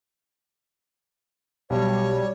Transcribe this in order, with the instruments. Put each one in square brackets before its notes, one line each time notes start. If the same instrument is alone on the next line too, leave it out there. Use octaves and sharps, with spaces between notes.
[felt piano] B1 [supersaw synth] G3 [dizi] C#5